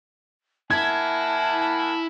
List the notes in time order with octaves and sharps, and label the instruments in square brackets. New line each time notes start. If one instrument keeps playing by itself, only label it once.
[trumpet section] A#3 F#5 G#5 [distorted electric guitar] E4 E5 [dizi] A5 [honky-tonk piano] G#6